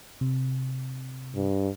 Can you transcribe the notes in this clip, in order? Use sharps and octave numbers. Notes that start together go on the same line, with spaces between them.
C3
G2